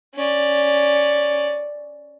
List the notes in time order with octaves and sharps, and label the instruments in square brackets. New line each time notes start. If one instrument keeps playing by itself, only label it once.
[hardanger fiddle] C#4 D5